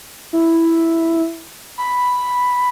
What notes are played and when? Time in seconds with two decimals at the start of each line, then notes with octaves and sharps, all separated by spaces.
0.33 E4
1.78 B5